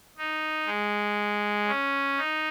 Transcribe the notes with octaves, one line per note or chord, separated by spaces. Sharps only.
D#4
G#3
C#4
D#4